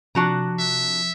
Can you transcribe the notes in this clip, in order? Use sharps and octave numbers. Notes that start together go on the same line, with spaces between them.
C3 F3 D4 F#4 A#5
E5